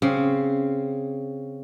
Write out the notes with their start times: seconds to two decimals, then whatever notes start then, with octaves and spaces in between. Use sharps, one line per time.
0.02 C#3 C4